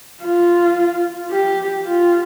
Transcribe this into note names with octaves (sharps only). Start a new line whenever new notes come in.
F4
G4
F4